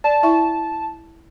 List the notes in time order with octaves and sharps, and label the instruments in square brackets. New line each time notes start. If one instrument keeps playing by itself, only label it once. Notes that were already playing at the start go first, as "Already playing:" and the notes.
[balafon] D5 [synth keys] A5
[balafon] E4 E5 C#6